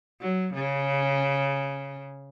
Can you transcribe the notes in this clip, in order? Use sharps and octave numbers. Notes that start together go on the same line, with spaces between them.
F#3
C#3